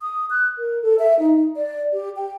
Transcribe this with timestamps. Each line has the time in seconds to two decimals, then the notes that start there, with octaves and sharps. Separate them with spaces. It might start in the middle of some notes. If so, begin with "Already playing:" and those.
0.01 D#6
0.30 F#6
0.58 A#4
0.82 A4
0.99 E5
1.19 D#4
1.56 D5
1.93 G4
2.16 G5